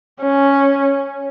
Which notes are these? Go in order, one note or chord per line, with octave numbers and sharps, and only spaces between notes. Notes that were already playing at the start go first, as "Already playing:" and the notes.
C#4